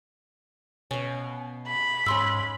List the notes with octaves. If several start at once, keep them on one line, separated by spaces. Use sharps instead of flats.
B2 C#4 F5
B5
G#2 C#4 C6 D6 E6